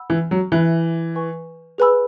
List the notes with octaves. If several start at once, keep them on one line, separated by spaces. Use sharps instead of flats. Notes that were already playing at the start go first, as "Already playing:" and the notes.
Already playing: F#5 B5 E6
E3
F#3
E3 E5 B5 F#6
B4 G#5 C#6
G#4 B4 G#5 B5 E6